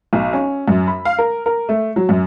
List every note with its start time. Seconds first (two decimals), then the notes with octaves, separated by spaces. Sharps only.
0.13 B1
0.33 C#4
0.68 F#2
0.88 B5
1.05 F5
1.18 A#4
1.46 A#4
1.69 A3
1.96 F#3
2.09 F#2